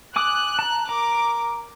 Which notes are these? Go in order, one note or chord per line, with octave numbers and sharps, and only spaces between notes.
G#5 D6 D#6 F#6
A5 A#5
A#4 A#5 D6